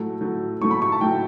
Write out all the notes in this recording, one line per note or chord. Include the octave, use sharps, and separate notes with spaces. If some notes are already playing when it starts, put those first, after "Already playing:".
Already playing: A2 F#3 A3
A2 F#3 A3
A2 F#3 A3 C#6
B5
C#6
A5
A2 F#3 A3 G5